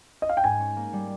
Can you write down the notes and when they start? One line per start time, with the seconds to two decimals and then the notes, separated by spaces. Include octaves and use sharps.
0.22 D#5
0.29 F5
0.37 G5
0.44 G#2 G#5
0.60 C#4
0.76 A#3
0.93 G3